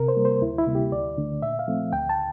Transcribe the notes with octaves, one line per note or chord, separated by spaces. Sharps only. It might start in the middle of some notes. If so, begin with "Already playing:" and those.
Already playing: C3 A#4
C5
G3 A#3
C5
D2 E4
E4
C3 G3 A#3
G4
D2 D5
D3 A3 D4
A#2 E5
F5
F3 A3 C4
D2 G5
A5